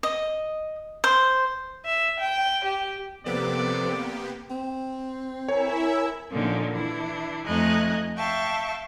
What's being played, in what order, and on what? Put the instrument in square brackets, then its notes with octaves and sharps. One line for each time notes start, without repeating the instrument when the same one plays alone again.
[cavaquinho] D#5
C5
[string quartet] E5
G5
G4
[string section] C3 [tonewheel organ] F3 A4 B4 [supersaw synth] A#3 B3 G4 [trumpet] D5
[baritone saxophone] C4
[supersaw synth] E4 E5 [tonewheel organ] A#4 G#5 [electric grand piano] C#5
[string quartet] A#2 D3 F3 A#3 C#4 D#4
E3 D4 E4
F2 A3 D#4 D#5 G#5 F#6
E5 F5 G5 A5 C#6